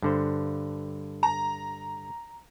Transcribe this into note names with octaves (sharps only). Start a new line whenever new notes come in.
G2 D3 C5
A#5